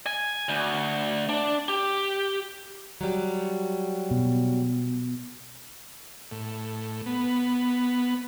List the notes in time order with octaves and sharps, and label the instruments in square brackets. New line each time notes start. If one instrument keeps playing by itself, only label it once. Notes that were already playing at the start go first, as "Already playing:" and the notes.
[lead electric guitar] G#5
D2
D4
G4
[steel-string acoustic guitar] F#3 G3
[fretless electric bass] B2
[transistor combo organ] A2
B3